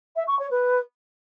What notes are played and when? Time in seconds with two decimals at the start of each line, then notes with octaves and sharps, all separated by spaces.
0.16 E5
0.27 C#6
0.39 C#5
0.51 B4